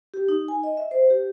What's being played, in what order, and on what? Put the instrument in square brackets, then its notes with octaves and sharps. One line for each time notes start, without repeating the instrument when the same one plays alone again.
[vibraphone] G4
D#4
G#5
D#5
E5
C5
G4